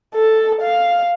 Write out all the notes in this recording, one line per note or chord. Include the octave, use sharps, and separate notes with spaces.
A4
F5